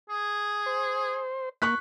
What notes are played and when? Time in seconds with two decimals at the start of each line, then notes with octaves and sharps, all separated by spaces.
0.09 G#4
0.66 C5
1.62 A#3 C#6 F#6 B6